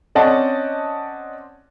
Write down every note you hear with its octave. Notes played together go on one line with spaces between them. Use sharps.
C4 C#4 D5 D#5 F#5 A5